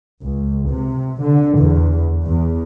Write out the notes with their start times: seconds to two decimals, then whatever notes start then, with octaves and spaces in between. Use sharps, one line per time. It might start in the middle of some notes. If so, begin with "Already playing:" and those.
0.22 C#2
0.69 C3
1.21 D3
1.59 E2
2.26 E2